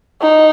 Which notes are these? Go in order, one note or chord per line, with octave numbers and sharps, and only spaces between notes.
D#4